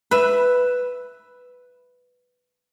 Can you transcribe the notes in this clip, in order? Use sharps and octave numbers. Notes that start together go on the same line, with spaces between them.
B4 E5